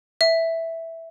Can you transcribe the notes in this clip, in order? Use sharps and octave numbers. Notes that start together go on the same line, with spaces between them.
E5